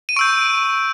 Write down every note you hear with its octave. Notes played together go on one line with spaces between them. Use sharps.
D#7
C#6 E6 G6 D7